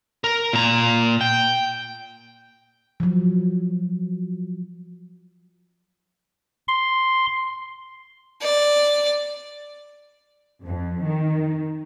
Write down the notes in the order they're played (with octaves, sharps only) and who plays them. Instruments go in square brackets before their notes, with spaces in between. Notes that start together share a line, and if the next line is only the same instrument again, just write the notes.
[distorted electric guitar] A#4
A#2 A#5
G5
[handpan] F3 F#3
[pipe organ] C6
[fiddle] D5
[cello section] F2
D#3